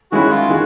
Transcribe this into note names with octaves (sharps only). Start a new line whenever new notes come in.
D#3 G#3 C#4 E4 F#4
F4
D#3 G#3 F#4